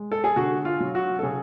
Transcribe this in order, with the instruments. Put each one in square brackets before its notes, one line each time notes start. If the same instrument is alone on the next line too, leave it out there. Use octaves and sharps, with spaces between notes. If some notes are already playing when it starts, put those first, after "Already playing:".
Already playing: [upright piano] G#3
A4
G#4
D3 F#4
F4
F#3
F#4
A4
C#3 G#4